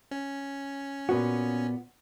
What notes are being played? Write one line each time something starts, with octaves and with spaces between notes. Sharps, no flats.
C#4
A#2 B3 F#4